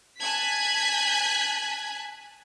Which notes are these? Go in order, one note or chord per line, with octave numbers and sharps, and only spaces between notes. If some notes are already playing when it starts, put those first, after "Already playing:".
G#5 A5 F#6 G#6 B6